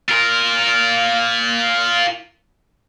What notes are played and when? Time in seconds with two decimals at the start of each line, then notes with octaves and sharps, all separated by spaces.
0.09 F4 A#4